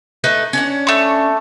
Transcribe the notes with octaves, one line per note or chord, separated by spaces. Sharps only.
A3 D#4 B4
C#4 D4 F#5
A3 C#6